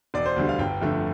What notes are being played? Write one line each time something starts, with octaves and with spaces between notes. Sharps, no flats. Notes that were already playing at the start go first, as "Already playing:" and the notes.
E1 D5
C5
D2 D3 G3
F5
G1 G5
F2 D3 A3